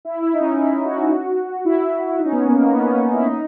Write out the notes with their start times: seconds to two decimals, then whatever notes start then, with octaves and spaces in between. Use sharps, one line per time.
0.05 E4
0.22 E4
0.34 D#4
0.41 C#4
0.58 E4
0.85 F#4
1.65 E4
2.19 D#4
2.25 C#4
2.32 B3
2.46 A#3
2.60 A#3
2.73 B3
2.86 C#4
3.00 D#4
3.13 E4
3.26 D#4